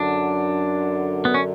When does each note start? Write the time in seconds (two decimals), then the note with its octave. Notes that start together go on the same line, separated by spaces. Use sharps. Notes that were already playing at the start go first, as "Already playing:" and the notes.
Already playing: F#2 D3 F#3 D4
1.25 B3
1.34 C#4